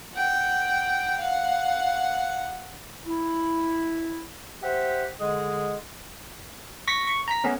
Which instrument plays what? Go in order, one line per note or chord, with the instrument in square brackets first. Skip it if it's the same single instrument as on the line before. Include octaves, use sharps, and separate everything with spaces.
[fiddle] F#5 G5
F5 F#5
[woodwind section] E4
G4 C5 E5 F#5
D3 G#3 G#4 D#5
[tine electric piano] C#6 A#6 B6
C#6
A#5 B6
A3 B3 C#4